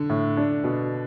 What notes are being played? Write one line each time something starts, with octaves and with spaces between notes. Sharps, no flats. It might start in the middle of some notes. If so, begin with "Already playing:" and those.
Already playing: D3
A2
D4
B2